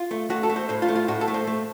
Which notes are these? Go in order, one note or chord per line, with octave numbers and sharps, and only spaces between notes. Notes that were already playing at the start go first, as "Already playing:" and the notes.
Already playing: F4
A3
A3 F#4
A4
A3
C5
A2 C5
F4
A3
F4
A2 F#4
A4
A3
C5
A3